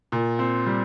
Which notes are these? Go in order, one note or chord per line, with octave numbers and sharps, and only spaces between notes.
A#2
C4
G3